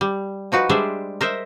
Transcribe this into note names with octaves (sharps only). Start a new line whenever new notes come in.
G3
F3 D#4 F#4 B4
G3 G#3 D4 C5 D5 E5
A#4 C5 D#5 E5